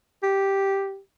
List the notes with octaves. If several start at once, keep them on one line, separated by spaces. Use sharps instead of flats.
G4